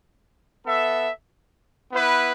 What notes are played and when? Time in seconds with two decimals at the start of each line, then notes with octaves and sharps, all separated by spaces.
0.66 B3 A4 E5
1.92 B3 E4 B4